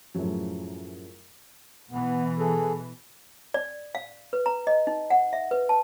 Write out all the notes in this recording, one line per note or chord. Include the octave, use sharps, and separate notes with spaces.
F#2 A2 C#3 F3 F#3
B2 E3 B3
G#4 A4
D5
F5
B4
A#5
D#5
D#4
F#5
E5
B4
A5